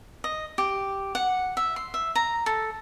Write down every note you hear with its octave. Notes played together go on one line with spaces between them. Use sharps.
D#5
G4
F#5
E5
C6
E5
A#5
A4